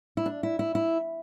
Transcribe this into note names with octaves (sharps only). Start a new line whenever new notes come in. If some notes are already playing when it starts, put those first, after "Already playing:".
E4
D4
E4
E4
E4